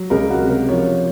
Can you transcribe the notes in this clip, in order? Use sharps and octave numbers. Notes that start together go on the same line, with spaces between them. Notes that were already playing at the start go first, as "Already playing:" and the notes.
Already playing: F#3
C#2 A#4
F#4
C3
A#4
F3 C#5